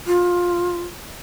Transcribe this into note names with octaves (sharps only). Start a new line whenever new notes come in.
F4